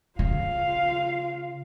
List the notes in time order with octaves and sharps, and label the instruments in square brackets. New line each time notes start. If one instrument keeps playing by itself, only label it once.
[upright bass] C#3 [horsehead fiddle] F4 F5